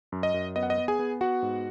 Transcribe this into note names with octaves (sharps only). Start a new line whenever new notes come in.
F#2
D#5
F#2
B3 D#5
F#5
D#5
B3
G#4 G#5
B3
B3 F#4 F#5
G#2